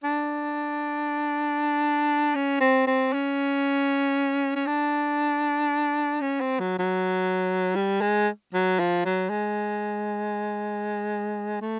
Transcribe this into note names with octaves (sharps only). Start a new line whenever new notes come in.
D4
C#4
C4
C4
C#4
C#4
D4
C#4
C4
F#3
F#3
G3
G#3
F#3
F3
F#3
G#3
A3